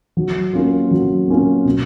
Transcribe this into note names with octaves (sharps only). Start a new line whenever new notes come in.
F#3
A#3 C#4 F4
F#3
A#3 C#4 F4
B2